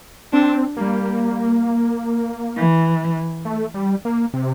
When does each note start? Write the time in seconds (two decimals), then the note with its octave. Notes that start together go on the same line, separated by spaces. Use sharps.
0.33 C4 D4
0.77 G3 A#3
2.55 E3
3.45 A3
3.74 G3
4.05 A#3
4.34 C3